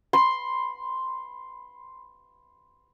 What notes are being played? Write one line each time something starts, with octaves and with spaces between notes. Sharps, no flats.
B5 C6